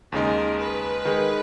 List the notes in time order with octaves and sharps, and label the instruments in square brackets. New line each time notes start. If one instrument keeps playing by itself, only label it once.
[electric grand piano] D#2 C#3 G#3 D#4 [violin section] A#4
[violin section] B4
[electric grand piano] D#3 G#3 D#4 G#4